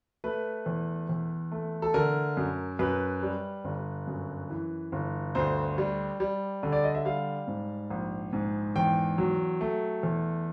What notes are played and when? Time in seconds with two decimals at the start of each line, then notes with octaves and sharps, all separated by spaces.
0.24 A3 B4
0.66 E2
1.09 E2
1.52 A3
1.82 A4
1.94 D3 A#4
2.37 F#2
2.79 F#2 B4
3.22 G3
3.64 G1
4.07 F#2
4.50 E3
4.92 G1
5.35 D2 C5
5.78 G3
6.20 G3
6.63 D3
6.72 D5
6.83 D#5
6.95 E5
7.05 G3 F5
7.47 G#2
7.90 A#1
8.33 G#2
8.76 E2 G5
9.18 F#3
9.61 A3
10.03 E2